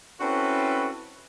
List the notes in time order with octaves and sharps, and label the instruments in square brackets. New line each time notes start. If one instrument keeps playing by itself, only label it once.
[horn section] C4 C#4 E4 F#4 A4 B4